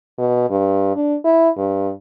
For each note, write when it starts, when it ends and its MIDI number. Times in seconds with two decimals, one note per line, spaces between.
0.18 0.48 47
0.50 0.93 43
0.96 1.15 62
1.25 1.49 64
1.57 1.91 43